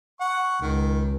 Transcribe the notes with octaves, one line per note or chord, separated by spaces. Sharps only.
F#5 C#6
C#2 D#3